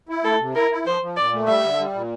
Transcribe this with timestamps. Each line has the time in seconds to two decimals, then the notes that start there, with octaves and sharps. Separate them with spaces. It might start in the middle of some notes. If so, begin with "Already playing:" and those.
0.09 E4
0.24 A3 A4
0.40 C3
0.55 E4 A#4
0.71 E4
0.86 F3 C5
1.02 F3
1.17 A#2 D5
1.33 A3
1.48 G3 E5
1.64 D3
1.79 G3
1.95 A#2